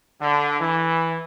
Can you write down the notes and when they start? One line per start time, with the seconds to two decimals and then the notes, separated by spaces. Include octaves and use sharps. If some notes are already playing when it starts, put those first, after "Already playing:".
0.21 D3
0.60 E3